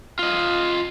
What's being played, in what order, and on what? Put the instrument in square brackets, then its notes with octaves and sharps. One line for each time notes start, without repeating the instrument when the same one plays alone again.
[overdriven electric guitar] F4 D#5